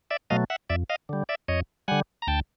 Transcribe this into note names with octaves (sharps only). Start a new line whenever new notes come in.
D5 E5
B2 F#3 A3 D#5 F5
E5 F#5
F2 D5 E5
D#5 F5
D3 G3
D5 E5
F2 C#5 D#5
D3 G3 F#5 G#5
A#5
D2 G5 A5